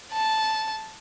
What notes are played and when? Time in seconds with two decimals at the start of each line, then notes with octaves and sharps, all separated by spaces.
0.13 A5